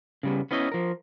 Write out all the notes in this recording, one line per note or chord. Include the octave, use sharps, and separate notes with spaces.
C#3 G3 B3
B3 C#4 E4 D#5
F3 A#4